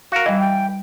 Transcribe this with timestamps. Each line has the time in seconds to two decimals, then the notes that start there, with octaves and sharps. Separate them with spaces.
0.12 F#4 A#4 F5
0.26 E3 G3 D#5
0.40 G5